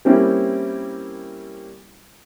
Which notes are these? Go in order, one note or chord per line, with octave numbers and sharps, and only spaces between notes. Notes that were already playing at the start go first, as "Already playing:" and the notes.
G3 A#3 C4 C#4 E4